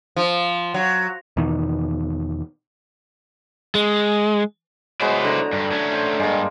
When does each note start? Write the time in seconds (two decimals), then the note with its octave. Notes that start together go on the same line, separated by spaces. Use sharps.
0.16 F3
0.74 F#3
1.37 E2 B2 D#3
3.75 G#3
5.00 F#3 G#3 B3 E4 C5
5.24 D3 A#5
5.53 G2
5.71 A3 C#4
5.93 C5
6.20 G2 G#3 A#3